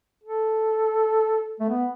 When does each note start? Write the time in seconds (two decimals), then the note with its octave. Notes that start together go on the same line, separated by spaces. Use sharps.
0.23 A4
1.60 A3
1.69 B3